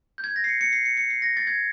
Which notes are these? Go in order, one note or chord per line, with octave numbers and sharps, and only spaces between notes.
G6
G#6
A#6
C7
C#7
C#7
C7
C#7
C#7
C7
A#6
A6
G#6